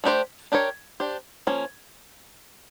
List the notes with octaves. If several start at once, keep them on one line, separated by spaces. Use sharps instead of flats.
A3 D4 G4 C5
D4 G4 A#4 C#5
D4 G4 C5
F3 A#3 C#4